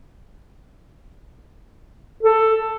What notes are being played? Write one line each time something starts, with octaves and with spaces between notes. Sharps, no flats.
A4